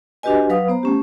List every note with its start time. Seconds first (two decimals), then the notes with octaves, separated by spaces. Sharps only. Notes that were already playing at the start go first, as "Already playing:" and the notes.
0.23 D4 F#4 G4 B4 D#5 G#5
0.49 F#3 B4 F5 D#6
0.68 B3 C5 A#5
0.83 A3 C#4 G4